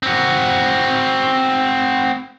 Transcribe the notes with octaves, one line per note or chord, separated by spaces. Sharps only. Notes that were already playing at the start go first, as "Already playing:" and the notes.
C4 F#4